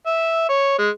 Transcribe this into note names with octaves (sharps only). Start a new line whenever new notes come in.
E5
C#5
G#3